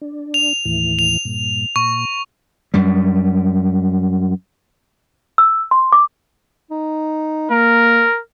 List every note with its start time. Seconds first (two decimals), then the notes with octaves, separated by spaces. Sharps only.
0.01 D4
0.34 F7
0.65 D#2 A2 E3
0.99 F7
1.25 G2 A#2
1.76 A#2 C#6
2.74 F#2 G3
5.38 E6
5.71 C6
5.92 D6
6.71 D#4
7.50 A#3 A#4